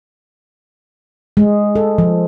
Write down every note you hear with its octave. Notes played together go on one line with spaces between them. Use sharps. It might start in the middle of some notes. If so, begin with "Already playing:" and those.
G#3
A4
F3